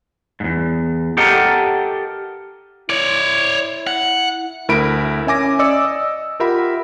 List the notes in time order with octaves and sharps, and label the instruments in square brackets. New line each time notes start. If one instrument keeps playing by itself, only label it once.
[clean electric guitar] E2 G#2
G4 A4 A#4 D#5 F#5 G5
[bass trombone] E4 [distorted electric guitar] C#5 D5
[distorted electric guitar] F#5
[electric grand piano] D2 E4 A#4 B5 D7
C#4 E5 G#5 D6 A#6
D5 D#5 D6 E6 C#7
D#5
F4 G4 A#4 E5 F#5 B5